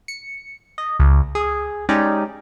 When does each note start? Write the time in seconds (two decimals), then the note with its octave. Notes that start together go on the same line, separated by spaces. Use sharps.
0.08 C#7
0.78 D#5
1.00 C#2
1.35 G#4
1.89 G#3 C#4 D#4 G4 D5